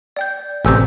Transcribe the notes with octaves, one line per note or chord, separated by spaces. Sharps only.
D5 G5 G6
A1 C3 G#5 E6 G6